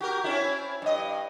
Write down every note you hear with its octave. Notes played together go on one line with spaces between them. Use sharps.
F#4 G4 A#4
C4 C#4 E4
G2 D#5